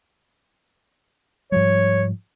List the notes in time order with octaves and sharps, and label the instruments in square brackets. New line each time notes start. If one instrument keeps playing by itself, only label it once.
[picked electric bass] G#2 F3 G3 [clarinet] C#5